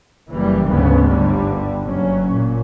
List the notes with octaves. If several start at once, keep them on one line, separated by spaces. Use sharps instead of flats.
F#1 E3 G3
D2 G#2 C#3 B3
G1 D3 G3
F#1 F#3 C#4
A#2